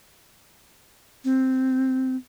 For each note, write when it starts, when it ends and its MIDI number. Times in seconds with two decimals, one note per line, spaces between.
1.25 2.16 60